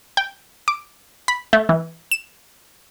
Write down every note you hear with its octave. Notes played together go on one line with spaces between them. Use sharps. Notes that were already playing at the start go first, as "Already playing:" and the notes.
G5
D6
B5
A3
E3
E7